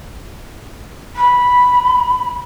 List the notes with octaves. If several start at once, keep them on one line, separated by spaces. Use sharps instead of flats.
B5